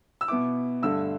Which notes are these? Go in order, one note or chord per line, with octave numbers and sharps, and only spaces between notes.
E6
B2 B3 E4 D6
G2 D3 A3 E6